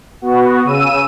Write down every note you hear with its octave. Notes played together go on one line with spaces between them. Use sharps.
B3 F#4
C#3 E6 D#7